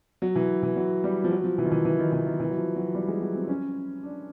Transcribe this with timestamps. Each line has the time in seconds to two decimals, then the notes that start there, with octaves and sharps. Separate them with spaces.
0.22 F#3
0.35 E3
0.63 E3
0.76 F#3
1.04 G3
1.24 F3
1.31 F#3
1.44 F3
1.58 E3
1.65 D#3
1.72 E3
1.85 E3
1.99 D#3
2.12 E3
2.26 D#3
2.40 E3
2.50 F#3
2.58 F3
2.76 F#3
2.94 G3
3.08 G#3
3.21 F#3
3.35 C4
3.48 C#4
4.03 D4